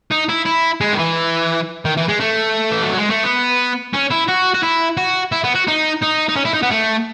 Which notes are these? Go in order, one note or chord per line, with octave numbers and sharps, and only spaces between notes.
D#4
E4
E4
G#3
D#3
E3
D#3
E3
G#3
A3
E3
F#3
G#3
A3
B3
C#4
E4
F#4
F#4
E4
F#4
E4
B3
F#4
D#4
D#4
D#4
C#4
E4
D#4
B3
A3